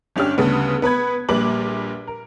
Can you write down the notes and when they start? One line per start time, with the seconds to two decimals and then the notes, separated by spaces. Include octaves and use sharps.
0.16 G1 C#4 D4 G4 F6
0.38 D2 C#3 G3 B3
0.82 B3 B4 B5 G#6
1.29 A#1 A#2 G3 B4 D6 F#7
2.07 A#4